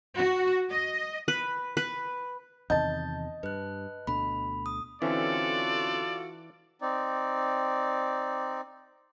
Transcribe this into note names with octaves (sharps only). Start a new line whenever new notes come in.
F#4
D#5
B4
B4
E2 C3 D#3 D#5 A5 G6 A6
G2 B4 F#6
D2 B2 D3 B5
D#6
D3 E3 C4 C#4 F4 F#4 A4 D5
C4 D#4 D5